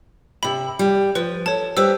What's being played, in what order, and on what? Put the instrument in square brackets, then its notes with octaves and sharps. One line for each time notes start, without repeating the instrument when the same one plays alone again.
[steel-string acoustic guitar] C3 E5 [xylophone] B5
[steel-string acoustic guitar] G3
[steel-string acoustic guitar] F3 [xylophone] B4
[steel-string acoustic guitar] A4 [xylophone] C#5 A5
[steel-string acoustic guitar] G3 B4 [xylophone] C5 E6